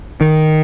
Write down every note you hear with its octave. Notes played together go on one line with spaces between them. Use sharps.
D#3